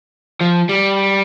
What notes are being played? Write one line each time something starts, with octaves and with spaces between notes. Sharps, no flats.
F3
G3